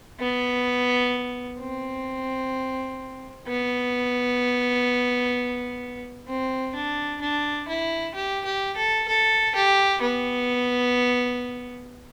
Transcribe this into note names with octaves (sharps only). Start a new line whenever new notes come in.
B3
C4
B3
C4
D4
D4
E4
G4
G4
A4
A4
G4
B3